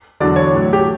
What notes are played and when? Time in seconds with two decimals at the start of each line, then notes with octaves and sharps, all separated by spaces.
0.20 E2 D3 F#3 D5
0.36 C#5
0.52 A2 F#3
0.73 G4